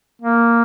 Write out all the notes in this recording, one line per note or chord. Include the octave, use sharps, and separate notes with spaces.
A#3